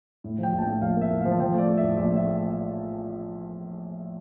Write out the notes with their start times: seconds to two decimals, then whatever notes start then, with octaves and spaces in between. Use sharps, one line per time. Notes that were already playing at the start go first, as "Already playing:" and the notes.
0.24 A2
0.38 F3 G5
0.53 A#1
0.58 A5
0.62 G5
0.67 A2
0.81 A#1 F5
0.96 A#3
1.01 E5
1.11 A2
1.21 F3 F5
1.32 A5
1.40 F3 G5
1.54 A3 D5
1.68 A3
1.77 E5
1.83 A2
1.97 A#1 D5
2.12 A3 E5
2.26 A3